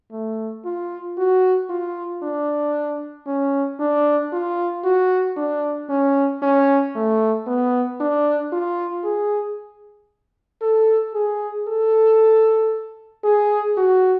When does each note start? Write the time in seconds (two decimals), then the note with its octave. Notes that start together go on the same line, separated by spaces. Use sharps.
0.12 A3
0.65 F4
1.18 F#4
1.69 F4
2.23 D4
3.27 C#4
3.80 D4
4.33 F4
4.84 F#4
5.37 D4
5.89 C#4
6.42 C#4
6.95 A3
7.47 B3
8.01 D4
8.53 F4
9.04 G#4
10.62 A4
11.14 G#4
11.68 A4
13.24 G#4
13.77 F#4